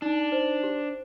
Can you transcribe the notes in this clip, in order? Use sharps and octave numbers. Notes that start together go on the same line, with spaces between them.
D4 D#4
C5
G4